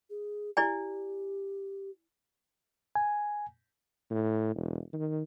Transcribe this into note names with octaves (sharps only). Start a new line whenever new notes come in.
G#4
E4 G4 D5 G#5
G#5
A2
E1
D#3